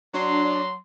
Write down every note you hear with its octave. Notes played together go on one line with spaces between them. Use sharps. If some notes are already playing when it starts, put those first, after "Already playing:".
F#3 D4 C6